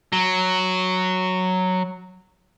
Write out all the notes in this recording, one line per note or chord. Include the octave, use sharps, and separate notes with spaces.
F#3